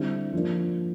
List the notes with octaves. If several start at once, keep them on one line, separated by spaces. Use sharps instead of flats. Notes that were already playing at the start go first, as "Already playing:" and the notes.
Already playing: D3 G3 C4 E4
F3 A#3 D4